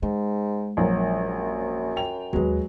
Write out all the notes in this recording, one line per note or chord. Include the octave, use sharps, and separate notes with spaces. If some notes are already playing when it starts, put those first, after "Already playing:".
G#2 G#3
A#1 F#2 F3 F#3 A#4
G5 F7
D#2 D#3 F#3 G#3 F#4 B4